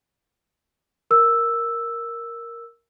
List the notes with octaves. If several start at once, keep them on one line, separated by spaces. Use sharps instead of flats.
A#4 E6